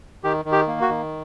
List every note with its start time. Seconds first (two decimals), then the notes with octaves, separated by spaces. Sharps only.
0.24 D#3 G4
0.45 D#3
0.52 G4
0.68 A#3
0.81 F#4
0.89 D#3